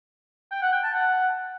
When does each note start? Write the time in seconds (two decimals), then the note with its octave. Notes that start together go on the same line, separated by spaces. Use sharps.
0.51 G5
0.62 F#5
0.73 G5
0.83 A5
0.94 F#5